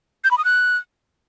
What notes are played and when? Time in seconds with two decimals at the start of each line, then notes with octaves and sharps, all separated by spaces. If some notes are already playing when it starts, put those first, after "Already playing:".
0.24 G6
0.31 B5
0.38 D#6
0.45 F#6